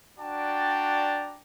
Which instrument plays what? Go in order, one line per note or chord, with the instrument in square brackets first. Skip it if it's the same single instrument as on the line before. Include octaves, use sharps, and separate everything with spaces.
[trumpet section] D4 F#4 D5 G5 A5 A#5